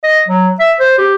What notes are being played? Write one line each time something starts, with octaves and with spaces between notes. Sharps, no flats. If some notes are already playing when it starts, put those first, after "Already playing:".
D#5
F#3
E5
C5
G4